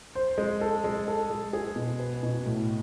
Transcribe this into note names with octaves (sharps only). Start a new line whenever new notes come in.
C5
G#3
A4
G#3
A4
G#3
G#4
B2
B4
B2
A2